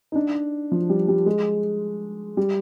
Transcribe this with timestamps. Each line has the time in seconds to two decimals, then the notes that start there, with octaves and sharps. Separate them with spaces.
0.12 D#4
0.15 D4
0.72 F3
0.90 G3
1.08 G3
1.26 G#3
2.37 G3